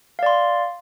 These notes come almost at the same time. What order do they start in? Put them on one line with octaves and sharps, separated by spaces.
F5 D5 C6